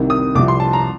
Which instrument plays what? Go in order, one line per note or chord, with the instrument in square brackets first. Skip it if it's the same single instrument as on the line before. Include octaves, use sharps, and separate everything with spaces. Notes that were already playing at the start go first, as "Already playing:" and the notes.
Already playing: [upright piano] C2 C3 D#3
D#6
C2 C3 F3 D6
C6
A5
A#5